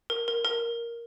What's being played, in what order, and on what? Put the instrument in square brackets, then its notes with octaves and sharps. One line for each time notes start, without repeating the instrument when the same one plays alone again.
[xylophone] A#4
A#4
A#4